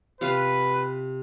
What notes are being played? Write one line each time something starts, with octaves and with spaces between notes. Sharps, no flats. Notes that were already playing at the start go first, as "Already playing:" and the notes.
C3 F4 B4 F5